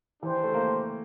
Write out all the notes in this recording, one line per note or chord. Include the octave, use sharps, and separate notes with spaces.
E3 D4 G4 C5 G5
A3
A#3